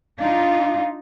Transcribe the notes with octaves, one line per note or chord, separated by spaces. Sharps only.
D4 D#4 F4 F5